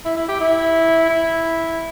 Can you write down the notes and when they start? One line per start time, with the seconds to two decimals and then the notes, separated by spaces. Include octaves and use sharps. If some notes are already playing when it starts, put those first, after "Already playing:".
0.05 E4
0.17 E4
0.28 G4
0.40 E4
1.09 E4